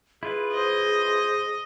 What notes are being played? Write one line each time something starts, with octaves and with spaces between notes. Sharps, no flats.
E4 F4 G#4 B4
C5 D#5